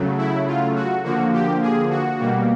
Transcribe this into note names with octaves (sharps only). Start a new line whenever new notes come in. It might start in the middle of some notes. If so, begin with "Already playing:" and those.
Already playing: C#3 F#3 A3
E4
F4
F#4
D3 F3 A#3 F#4
G4
G#4
F#4
B2 G3 A#3